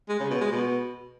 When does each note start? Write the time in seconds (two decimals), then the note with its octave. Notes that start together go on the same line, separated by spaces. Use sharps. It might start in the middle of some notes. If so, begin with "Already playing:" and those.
0.09 G#3
0.20 C#3
0.30 B2
0.41 G#3
0.52 B2